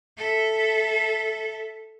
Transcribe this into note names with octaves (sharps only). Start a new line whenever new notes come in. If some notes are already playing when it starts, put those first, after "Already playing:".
A4 E5